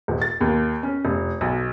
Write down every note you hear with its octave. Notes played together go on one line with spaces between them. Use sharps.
D#1
A6
D#2
C#4
F1
B1